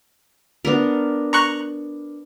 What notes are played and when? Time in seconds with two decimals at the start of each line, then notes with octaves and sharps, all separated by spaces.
0.65 B3 D4 A#4
1.33 A#5 C#6 F#6